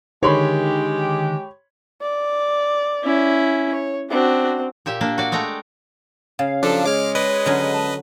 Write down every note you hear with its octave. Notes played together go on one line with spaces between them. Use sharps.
D3 D#3 G#3 G4 C#5 B5 C6
D5
C#4 E4
C#5
C4 D4 F#4
A#2 G4 E5
A#3 D4
F#4 D5
G#3 A3 G5 A#5
C#3 F5
F3 F#3 D4 G4 A4
G#3 C#5 D6 F6
B4 D5 D#5
D3 F#3 C#4
A5